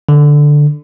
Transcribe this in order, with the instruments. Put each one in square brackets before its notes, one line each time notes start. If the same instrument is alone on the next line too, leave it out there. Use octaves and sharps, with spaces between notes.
[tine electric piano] D3